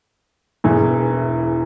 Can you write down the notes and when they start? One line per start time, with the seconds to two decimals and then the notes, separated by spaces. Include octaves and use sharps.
0.64 E1 E2 E3